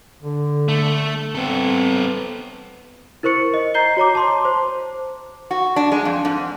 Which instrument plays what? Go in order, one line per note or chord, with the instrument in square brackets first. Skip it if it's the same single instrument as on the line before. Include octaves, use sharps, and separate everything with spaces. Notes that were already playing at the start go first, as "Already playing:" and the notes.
[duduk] D3
[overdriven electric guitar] A3
[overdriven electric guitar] B3 A4 [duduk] C4
[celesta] E4 A#4 C5 C#6 C#7
D#5
D#5 A#5 G6 C7 G7
F#4 C#5 A#5 D6
A5 C6 D6
C5
[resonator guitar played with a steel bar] F#4
D4
G#3
F2
G#2